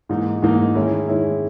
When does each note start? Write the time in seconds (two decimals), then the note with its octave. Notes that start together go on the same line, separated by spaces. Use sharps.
0.09 G#2 E3 A#3 D#4
0.42 G#2 E3 A#3 D#4
0.75 D#3 G#3 C#4 E4
1.08 D#3 G#3 C#4 E4